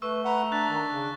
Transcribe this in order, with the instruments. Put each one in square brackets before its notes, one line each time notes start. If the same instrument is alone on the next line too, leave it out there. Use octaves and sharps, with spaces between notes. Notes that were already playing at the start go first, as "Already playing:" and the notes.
[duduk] A3 [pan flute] B4 [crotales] C#6 E6
[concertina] B4 F#5 [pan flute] A#5
[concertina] D4 [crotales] F#6 A6 B6
[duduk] D#3
C#3